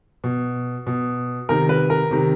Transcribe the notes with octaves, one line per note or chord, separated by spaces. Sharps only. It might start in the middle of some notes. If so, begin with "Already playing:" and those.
B2
B2
C3 D#3 A#4
B4
A#4
C3 D#3